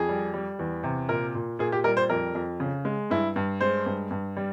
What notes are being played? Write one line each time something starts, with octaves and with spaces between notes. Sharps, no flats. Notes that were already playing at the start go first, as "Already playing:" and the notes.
Already playing: F2 G#4
G3
G3
E2
C3
A#2 A#4
A#2
A#2 G#4
G4
G3 A#4
C5
F2 A#4
F2
C#3
G#3
G2 E4
G2
G#3 C5
G2
G2
G3